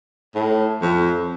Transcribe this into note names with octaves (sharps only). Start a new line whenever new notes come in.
A2
F2